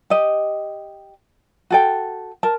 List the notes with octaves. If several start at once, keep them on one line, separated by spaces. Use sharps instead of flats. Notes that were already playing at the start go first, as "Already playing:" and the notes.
G4 D#5
F#4 A4 G5
A#4 A5